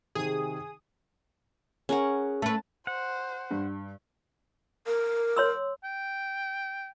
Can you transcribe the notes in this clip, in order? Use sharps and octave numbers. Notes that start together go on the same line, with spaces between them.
C3 D#3 G#4 D#6
C#4 G#4 A#4 F#5
A3 B4 A5
C5 F#5
G2
A#4
C#5 C6 E6
G5